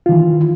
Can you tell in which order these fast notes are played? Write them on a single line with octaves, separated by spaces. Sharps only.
F4 D#3 E3